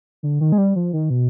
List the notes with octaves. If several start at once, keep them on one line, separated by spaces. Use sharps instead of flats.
D3
D#3
G#3
G3
F3
D#3
B2